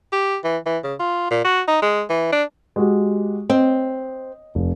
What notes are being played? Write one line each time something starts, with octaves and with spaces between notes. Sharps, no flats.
G4
E3
E3
C#3
F4
A#2
F#4
D#4
G#3
E3
D4
G#3 F#4 G4
C4 D#5
F1